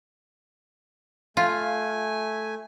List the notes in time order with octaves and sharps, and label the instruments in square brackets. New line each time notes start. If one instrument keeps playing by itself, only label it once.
[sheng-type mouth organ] A3 G#5 [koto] F4